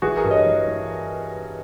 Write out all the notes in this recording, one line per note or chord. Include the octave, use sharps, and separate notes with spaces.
E3 F#4 G#4
G#4 A#4
G2
C#5 D#5
E3
E3